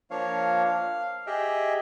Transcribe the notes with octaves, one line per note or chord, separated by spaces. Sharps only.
F3 A#3 D4 C#5 F5
F5
G4 G#4 D#5 E5 G5